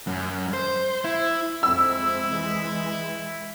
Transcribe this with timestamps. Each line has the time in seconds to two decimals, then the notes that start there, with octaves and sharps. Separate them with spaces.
0.07 F#2
0.53 C5
1.04 E4
1.63 F2 G#3 C4 E4 E6
2.27 E3 G#3